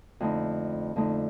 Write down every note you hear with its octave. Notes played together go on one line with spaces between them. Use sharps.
F2 D3 A3 D#4
F2 D3 A3 D#4